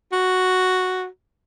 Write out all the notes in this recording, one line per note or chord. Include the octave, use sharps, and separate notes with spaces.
F#4